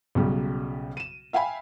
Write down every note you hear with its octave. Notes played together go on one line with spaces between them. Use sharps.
B1 C#3 F#3 G3
D#7 E7
E5 F5 G5 G#5 B5